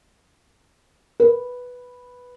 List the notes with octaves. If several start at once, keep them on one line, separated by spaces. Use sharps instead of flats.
B4